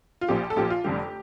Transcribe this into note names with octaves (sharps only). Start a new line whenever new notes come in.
F4
A#1 A#2 F3 G4
A4
A#1 A#2 F3 G4
F4
F1 F2 D3 G3 G4